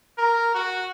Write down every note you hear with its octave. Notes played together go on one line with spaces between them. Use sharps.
A#4
F#4